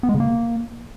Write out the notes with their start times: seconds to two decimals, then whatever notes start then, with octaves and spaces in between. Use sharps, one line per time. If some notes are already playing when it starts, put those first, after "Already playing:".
0.03 B3
0.09 G#3
0.14 C#3
0.20 A#3